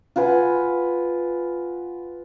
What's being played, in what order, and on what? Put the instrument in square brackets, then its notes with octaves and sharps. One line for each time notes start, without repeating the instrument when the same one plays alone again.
[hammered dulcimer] F4 B4 F#5 G#5